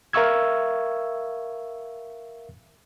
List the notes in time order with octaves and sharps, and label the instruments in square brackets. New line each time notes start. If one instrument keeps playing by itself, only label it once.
[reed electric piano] A#4 E5 F5 C#6 E6 G#6